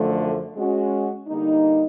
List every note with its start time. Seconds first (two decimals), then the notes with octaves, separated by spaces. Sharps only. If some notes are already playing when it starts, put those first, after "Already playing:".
Already playing: F#2 D3 F3 A3
0.54 G#3 C#4 F#4
1.27 D3 G3 A#3 D#4